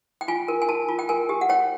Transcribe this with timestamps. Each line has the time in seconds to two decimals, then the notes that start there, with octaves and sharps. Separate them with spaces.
0.21 G5
0.28 F4 G#5
0.48 A#4
0.62 G#5
0.69 A#4 A5
0.88 F4
0.99 G5
1.09 A#4 G#5
1.29 G4
1.41 F#5
1.49 C#5 G5